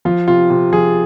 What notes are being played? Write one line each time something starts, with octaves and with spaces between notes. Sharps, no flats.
F3 F4
C3 F4
C3 F4
F3 G#4